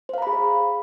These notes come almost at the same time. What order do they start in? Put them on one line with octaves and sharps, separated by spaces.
C5 F5 A#5 B5 G#4